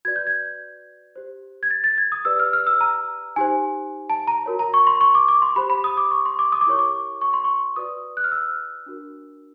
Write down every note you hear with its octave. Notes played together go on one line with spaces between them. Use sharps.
F#4 B4 D5 G#6
G6
G#6
G4 C5
G#6
A6
A6
G#6
D#6
G4 B4 D5 E6
F6
F6
E6
A#5
D#4 G4 C5 G#5
A5
A#5
F#4 A#4 C#5
A#5
C#6
C6
C#6
D6
D6
C6
G4 C5 B5
B5
D#6
D6
C#6
C6
D6
D#6
D6
E4 G4 A#4 C#5 C#6
D6
C#6
C6
C#6
F#4 B4 D5 D#6
F#6
F6
E6
D4 F#4 A#4